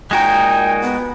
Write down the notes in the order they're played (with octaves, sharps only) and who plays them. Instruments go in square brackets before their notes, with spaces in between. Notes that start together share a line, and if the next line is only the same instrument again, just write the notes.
[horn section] A#2 D#4 G#5 [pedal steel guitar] G#3 F#4 A#4 [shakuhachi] G5
[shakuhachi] B3